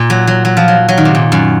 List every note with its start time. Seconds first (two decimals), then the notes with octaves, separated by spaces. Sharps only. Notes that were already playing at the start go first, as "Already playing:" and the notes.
Already playing: A#2
0.10 F#3
0.27 F#3
0.45 F#3
0.57 F3
0.68 F#3
0.89 F#3
0.97 D#3
1.05 C3
1.15 A#2
1.32 F#2